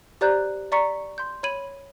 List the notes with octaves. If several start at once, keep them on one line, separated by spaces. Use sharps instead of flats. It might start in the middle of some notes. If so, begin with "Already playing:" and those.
G4 C5 D5 A#5 F#6 G6
D5 A#5 C#6 B6 C#7
C6 G6
C#5 B5 G#6 D#7 F#7